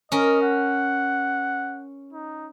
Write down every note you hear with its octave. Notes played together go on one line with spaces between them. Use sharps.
C#4 A#4 D#5
F#5
D#4